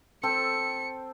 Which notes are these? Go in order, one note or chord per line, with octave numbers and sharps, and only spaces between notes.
C4 A4 G5 C#7